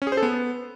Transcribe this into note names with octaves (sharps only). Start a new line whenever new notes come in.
C#4
G#4
C5
A4
B3